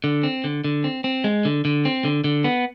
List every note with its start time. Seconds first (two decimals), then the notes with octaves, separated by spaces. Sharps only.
0.04 D3
0.23 C4
0.44 D3
0.64 D3
0.84 C4
1.04 C4
1.24 G#3
1.45 D3
1.65 D3
1.85 C4
2.05 D3
2.24 D3
2.44 B3